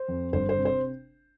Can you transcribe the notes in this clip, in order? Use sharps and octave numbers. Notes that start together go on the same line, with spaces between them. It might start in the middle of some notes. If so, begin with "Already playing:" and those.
Already playing: C5
F2
G1 C5
C5
C3
C5